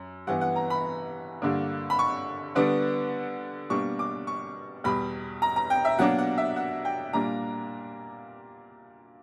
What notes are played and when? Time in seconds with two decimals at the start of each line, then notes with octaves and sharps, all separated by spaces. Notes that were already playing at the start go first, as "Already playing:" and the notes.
Already playing: F#2
0.27 G2 E3 B3 F#5
0.41 F#5
0.56 A#5
0.70 B5
1.42 G2 D3 A#3 D4
1.90 B5
1.99 C#6
2.55 D3 G3 B3 D4
3.70 B2 G3 A#3 D4 C#6
3.99 D6
4.27 C#6
4.84 E2 B2 G3 B5
5.42 A#5
5.56 A#5
5.70 G5
5.85 E5
5.99 B2 F#3 A#3 D4 F#5
6.18 F#5
6.38 E5
6.56 F#5
6.85 G5
7.13 A#2 G3 A#3 D4 A#5